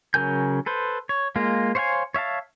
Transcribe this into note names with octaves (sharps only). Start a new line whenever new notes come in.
C#3 F#3 A#4 G#5 G6
A4 B4 C5
C#5
G#3 A#3 F4
C5 C#5 F5 F#5 G#5
C#5 E5 F5 A5